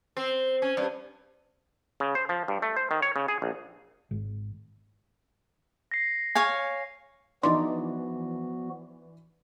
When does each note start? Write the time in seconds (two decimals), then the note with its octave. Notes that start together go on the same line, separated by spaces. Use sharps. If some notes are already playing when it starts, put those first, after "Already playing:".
0.17 C4
0.62 C#4
0.77 G2
2.00 C#3
2.15 C5
2.29 F3
2.48 G2
2.62 A3
2.76 C5
2.91 D#3
3.02 C#5
3.16 C#3
3.28 G#4
3.42 A#1
4.11 G#1
5.91 A#6 C7
6.35 C#5 F5 G#5
7.43 E3 F3 B3 D4 D#4 F#4 D5 C6